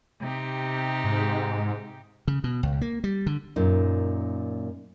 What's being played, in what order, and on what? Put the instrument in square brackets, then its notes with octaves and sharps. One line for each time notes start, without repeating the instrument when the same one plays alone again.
[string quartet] C3 D#4 G4
[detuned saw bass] G#2
[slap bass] C#3
B2
C#2
A#3
G3
D3
[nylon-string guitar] F#2 A#2 D#4